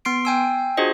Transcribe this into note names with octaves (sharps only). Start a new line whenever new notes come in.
B3 C6 C7 D7
G5 G#5 E6
D4 F4 F#4 G#4 C5 D#5